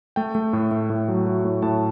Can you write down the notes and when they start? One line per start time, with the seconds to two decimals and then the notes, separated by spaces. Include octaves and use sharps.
0.16 A3 G5
0.35 A3
0.53 A2
0.71 A3
0.90 A2
1.08 F#3
1.27 F#3
1.44 A2
1.62 A2 A5